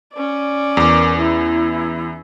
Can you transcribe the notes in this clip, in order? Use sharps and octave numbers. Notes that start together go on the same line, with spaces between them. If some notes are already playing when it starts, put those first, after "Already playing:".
C#4 D5
E2 A#4 D6
E4